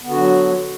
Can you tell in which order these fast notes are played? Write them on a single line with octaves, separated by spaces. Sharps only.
B3 D3 F#4 F#3